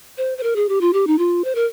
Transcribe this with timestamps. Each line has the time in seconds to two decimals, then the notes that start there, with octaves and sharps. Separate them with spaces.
0.17 C5
0.38 C5
0.43 A#4
0.56 G#4
0.69 G4
0.81 F4
0.93 G4
1.07 D#4
1.18 F4
1.44 C5
1.55 A#4